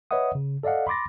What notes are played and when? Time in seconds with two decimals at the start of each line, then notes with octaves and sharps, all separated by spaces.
0.11 B4 C#5 D#5 E5 F#5 D#6
0.35 C#3
0.63 A4 D5 D#5 F5 F#5
0.87 B5 C6 D6 A6 A#6